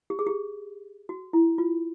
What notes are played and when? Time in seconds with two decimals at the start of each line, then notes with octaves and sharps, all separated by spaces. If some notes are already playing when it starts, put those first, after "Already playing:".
0.10 G4
0.19 G#4
0.27 G4
1.09 F#4
1.33 E4
1.58 F4